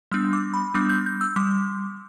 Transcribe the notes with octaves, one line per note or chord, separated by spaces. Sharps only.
G3 B3 D4 E6
D6
B5
G3 B3 D4 D6
G6
G6
E6
G3 D6